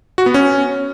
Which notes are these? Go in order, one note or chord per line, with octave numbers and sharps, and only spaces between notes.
F#4
B3
C#4